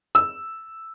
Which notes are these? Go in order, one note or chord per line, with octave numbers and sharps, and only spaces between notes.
E6